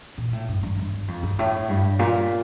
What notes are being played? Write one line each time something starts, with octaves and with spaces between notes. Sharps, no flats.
A#2
A2
G2
G2
G2
G2
F2
G2
A2
G2
A#2